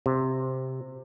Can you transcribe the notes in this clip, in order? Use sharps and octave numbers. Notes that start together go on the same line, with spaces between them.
C3